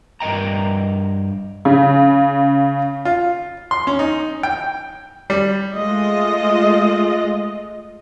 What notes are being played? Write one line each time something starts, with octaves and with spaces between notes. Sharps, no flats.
G2 A#4 D#5 G5 A#5
C#3
F4
C6
C#4
D#4
G5
G3
G#3 A3 F4 D#5